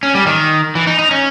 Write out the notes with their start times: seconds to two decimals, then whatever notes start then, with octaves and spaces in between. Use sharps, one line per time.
0.03 C#4
0.15 G3
0.27 D#3
0.75 E3
0.87 D#4
0.99 D#4
1.11 C#4